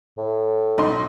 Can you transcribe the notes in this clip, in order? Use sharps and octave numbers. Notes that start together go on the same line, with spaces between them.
A2
B1 D#4 C6